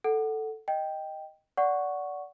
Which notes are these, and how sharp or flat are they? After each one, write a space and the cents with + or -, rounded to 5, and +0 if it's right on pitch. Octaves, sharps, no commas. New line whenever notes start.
A4 +0 F#5 +10
D#5 +0 G5 +0
D5 -20 F#5 +0 C#6 +0